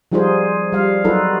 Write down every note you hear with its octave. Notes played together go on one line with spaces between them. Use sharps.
F3 G3 D#4 F4 G#4 C5
G3 F5
F#3 D#4 F4 A4 B4